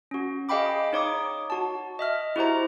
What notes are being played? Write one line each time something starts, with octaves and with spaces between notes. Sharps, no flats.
C#4 F#4
G#4 D#5 F5 G5 B5 D6
D#4 C#5 D6 D#6
F#4 A5
D#5 E5 F6
E4 F#4 G4 C5 A#5